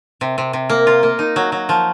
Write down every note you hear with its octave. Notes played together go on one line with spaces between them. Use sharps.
C3
C3
C3
A#3
F4
A#3
D#4
F#3
F#3
F3